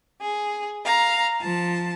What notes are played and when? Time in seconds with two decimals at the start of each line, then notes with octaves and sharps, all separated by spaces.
0.21 G#4
0.86 F5 A#5
1.41 F3 A5